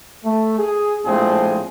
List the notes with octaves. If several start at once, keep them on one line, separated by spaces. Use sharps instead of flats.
A3
G#4
A#1 A2 F3 G#3 C4 G#4